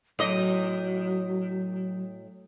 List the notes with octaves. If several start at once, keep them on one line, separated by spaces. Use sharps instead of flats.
A2 F#3 D#5